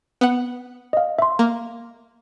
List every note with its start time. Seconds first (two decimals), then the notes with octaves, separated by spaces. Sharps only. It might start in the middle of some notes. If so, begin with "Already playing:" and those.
0.21 B3 F#5
0.93 D#5 F5
1.19 E5 C6
1.39 A#3